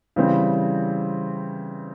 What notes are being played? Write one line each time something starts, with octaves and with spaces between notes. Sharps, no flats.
C#3 E3 G3 C4